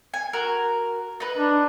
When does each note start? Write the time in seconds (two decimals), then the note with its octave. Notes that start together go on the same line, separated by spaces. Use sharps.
0.14 G#5
0.33 F#4 A#4
1.20 D#4 B4
1.37 D4